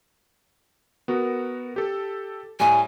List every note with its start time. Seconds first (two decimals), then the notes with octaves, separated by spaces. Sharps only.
1.08 B3 F#4 A#4
1.76 G4 A4
2.60 A2 G3 G#5